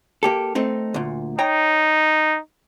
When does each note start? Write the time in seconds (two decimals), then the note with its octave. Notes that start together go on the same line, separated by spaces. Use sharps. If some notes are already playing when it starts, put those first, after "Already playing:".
0.23 A#3 G4 A4
0.55 A3 C4 D#4
0.94 D2 A#2
1.39 D#4 C#5 G5 A#5